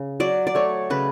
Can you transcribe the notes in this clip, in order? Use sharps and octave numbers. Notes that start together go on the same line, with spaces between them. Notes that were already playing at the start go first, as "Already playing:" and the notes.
Already playing: C#3
F#3 D5
D5
A3 C#5
C#3 B4